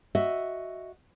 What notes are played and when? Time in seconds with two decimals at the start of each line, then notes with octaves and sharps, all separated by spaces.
0.15 F#4 D#5 E5